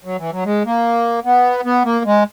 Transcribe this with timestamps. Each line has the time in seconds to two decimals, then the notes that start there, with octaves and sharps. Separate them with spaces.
0.05 F#3
0.19 E3
0.32 F#3
0.45 G#3
0.66 A#3
1.25 B3
1.65 B3
1.85 A#3
2.06 G#3